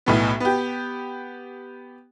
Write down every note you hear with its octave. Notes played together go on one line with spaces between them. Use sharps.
B1 A2 B3
B3 G4